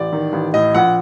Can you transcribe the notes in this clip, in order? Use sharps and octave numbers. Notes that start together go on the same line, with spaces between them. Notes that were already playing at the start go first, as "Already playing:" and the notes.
Already playing: A1 D5
D#3
A1
A2 D#5
A#1 F#5